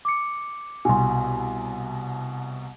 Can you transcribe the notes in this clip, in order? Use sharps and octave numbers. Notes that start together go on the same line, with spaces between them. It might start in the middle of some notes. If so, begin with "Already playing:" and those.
D6 C#7
C2 B2 G#5 C6